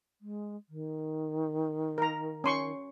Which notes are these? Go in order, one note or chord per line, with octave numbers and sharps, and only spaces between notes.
G#3
D#3
A#4 A#5
C#4 C6 C#6